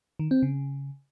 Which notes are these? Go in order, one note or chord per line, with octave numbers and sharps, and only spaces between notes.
D#3
C4
C#3